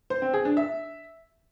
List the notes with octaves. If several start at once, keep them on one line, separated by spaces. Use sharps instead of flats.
C5
C4
G#4
D4
E5